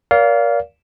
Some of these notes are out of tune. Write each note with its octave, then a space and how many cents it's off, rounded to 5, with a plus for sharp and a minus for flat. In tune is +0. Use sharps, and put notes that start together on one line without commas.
A#4 +25 D5 -40 F5 +0